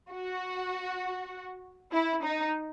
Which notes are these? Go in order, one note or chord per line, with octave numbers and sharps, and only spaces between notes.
F#4
E4
D#4